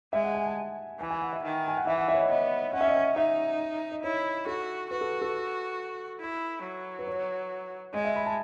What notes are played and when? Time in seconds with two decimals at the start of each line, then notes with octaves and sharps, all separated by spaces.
0.13 G#3 E5
0.24 F#5
0.35 G#5
0.46 A5
1.00 E3 G#5
1.11 G#5
1.22 F#5
1.33 E5
1.44 D#3
1.68 G#5
1.77 F#5
1.87 E3 E5
1.98 F#5
2.08 E5
2.14 C#5
2.19 D#5
2.30 B3 D#5
2.73 C#4 F#5
2.81 E5
2.88 D#5
2.96 E5
3.16 D#4 E5
3.92 D#5
4.03 E4 C#5
4.46 F#4 A4
4.91 F#4 B4
5.01 A4
5.22 A4
6.20 E4
6.64 F#3
6.99 B4
7.07 C#5
7.94 G#3 D#5
8.05 E5
8.16 B5
8.27 A5